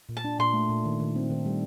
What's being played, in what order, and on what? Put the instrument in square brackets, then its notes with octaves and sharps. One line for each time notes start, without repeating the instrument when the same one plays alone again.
[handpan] A#2
[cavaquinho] A5
[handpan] D4
[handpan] A#2 [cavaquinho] C6
[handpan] A3
A#2
D#3
D#3
C4
D#3
G3